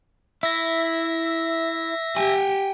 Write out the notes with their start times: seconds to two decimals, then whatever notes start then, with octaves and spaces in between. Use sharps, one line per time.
0.43 E4 E5 A#6
2.17 G4 G5 G#5